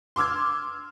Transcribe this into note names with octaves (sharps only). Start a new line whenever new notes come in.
C6 D6 E6 F6 G#6